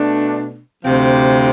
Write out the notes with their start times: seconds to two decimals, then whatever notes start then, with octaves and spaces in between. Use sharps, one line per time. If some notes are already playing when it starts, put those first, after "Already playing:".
Already playing: B2 A3 D4
0.84 D2 C3 F3 C4